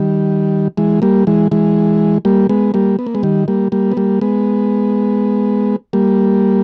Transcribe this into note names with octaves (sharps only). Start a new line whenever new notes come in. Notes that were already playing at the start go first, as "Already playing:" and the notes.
Already playing: D#3 G3
E3 G#3
G3 A#3
E3 G#3
E3 G#3
G3 A#3
G#3 B3
G3 A#3
B3
A#3
G#3 B3
D#3 G3
G3 A#3
G3 A#3
B3
G3 A#3
G#3 B3
G3 A#3